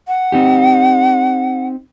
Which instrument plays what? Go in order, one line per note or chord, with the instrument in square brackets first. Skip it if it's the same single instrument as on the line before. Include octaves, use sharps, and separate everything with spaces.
[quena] F#5
[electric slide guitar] C4 D#4 G4